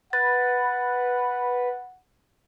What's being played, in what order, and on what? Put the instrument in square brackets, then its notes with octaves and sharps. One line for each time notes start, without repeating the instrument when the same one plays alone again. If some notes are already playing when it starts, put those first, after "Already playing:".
[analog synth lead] B4 [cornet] F#5 [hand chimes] A6